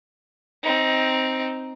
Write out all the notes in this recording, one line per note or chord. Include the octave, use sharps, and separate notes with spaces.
C4 D#4